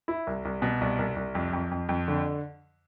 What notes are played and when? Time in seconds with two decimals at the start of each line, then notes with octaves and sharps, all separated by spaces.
0.08 E4
0.27 C2
0.45 C2
0.62 B2
0.81 C2
0.99 C2
1.16 C2
1.35 F2
1.53 F2
1.71 F2
1.89 F2
2.08 D3